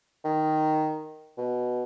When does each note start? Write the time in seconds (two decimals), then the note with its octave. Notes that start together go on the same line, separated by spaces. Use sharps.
0.25 D#3
1.38 B2